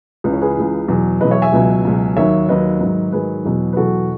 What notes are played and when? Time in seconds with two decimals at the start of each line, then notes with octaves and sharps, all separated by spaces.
0.24 C#2 C#3 E3 B4
0.33 C#5
0.42 G#4 B4
0.56 C#2 C#3 E3
0.88 E2 B2 F#3
1.21 E2 B2 F#3 B4 D#5
1.31 C#5 E5
1.42 E5 G#5
1.53 C#2 B2 F#3
1.85 C#2 B2 F#3
2.17 D#2 D#3 F#3 C#5 E5
2.49 D#2 D#3 F#3 B4 D#5
2.81 G#2 D#3 F#3
3.13 G#2 D#3 F#3 G#4 B4
3.45 E2 B2 F#3
3.73 B4
3.77 E2 B2 F#3 F#4 A4